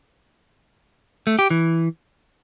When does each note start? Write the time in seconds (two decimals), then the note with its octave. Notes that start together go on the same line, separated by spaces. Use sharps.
1.27 A3
1.39 G4
1.51 E3